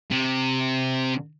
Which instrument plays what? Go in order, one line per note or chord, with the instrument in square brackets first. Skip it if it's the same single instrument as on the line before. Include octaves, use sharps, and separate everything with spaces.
[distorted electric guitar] C3